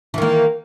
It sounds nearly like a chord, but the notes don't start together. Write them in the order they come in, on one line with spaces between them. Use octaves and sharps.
E3 D#3 A#3